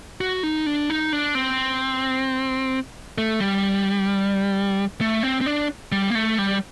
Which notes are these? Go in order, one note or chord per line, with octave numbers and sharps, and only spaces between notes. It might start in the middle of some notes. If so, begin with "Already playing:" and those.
F#4
D#4
D4
D#4
D4
C4
A3
G3
A3
C4
C4
D4
G3
A#3
A3
G3